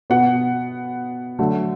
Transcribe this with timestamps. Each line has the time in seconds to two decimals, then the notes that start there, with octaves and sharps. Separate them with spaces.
0.10 B2 B3 F#5
1.39 D3 F#3 A3